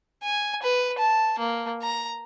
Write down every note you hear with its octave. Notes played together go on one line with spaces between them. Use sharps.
G#5
B4
A5
A#3
A#5